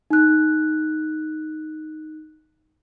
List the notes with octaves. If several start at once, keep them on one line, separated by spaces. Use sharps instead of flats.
D#4 F#6